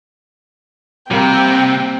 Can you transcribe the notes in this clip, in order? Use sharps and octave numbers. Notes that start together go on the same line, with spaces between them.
C3 G3 A#3 C4 G5